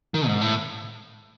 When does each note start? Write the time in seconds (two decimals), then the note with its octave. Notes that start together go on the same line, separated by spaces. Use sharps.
0.14 D#3
0.27 G#2
0.41 A2